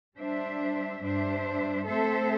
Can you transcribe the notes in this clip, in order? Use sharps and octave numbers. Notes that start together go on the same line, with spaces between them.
G3 D4 C5 E5
G2 G3 D4 C5 E5
A3 C4 A4 C5 E5